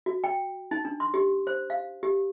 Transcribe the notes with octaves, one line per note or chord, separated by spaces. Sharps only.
F#4
G5
D#4
D4
C6
G4
C5
F5
G4